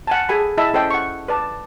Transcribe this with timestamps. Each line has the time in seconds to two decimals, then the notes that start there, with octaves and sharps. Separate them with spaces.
0.07 F#5 G#5 A5
0.29 G#4 A4 G#5 B5
0.58 E4 D#5 E5 A5 B5 E6
0.74 C#4 A4 C5 D#5 G5
0.91 F#5 C#6
1.28 B4 D5 A5